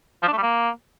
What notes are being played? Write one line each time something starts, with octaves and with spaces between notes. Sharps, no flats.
F3
D4
A3
G3
A#3